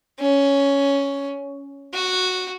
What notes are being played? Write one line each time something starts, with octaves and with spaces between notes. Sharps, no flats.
C#4
F#4